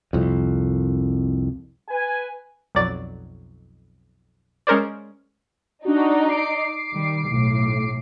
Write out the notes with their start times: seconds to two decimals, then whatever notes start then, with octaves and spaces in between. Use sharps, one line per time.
0.13 C2 F2
1.89 B4 G#5
2.75 B1 F2 F#3 D5 A6
4.67 G#3 C#4 A#4 C5 D5
5.85 D4 D#4 F#4 D5
6.28 D6 C7 D7
6.92 D#3 G3
7.27 B1 A2